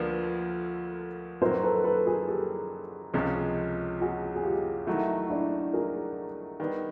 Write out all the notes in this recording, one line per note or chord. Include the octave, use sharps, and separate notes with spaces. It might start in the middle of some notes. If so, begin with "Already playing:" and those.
Already playing: D2 D3 F3 A#3 A4 B4
F#2 D#3 F#3 A#4 C5
A4 B4
A4 B4
G#4 A#4
G4 A4
C#2 C3 F3 G#3 C#4
F#4 G#4
G#4
F4 G4
D#3 F#3 A3 E4 F#4
D4 E4
G#4 A#4
D#3 G3 B3